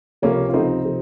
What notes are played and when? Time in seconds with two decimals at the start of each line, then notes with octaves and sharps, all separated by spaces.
0.22 C#2 C3 F3 A#3 C#4
0.49 F4
0.54 C#2 C3 F3 C4 D#4
0.85 C3 F3